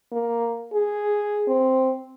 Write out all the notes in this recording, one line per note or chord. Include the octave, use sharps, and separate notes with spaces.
A#3
G#4
C4